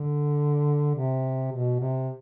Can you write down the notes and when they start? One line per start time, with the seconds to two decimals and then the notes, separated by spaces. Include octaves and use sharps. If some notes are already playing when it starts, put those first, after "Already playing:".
Already playing: D3
0.95 C3
1.52 B2
1.80 C3